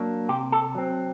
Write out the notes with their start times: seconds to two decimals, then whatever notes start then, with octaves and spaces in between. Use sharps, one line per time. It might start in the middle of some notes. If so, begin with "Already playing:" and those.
Already playing: F#3 A#3 D4
0.29 C3 G4
0.52 A4
0.75 F#3 C4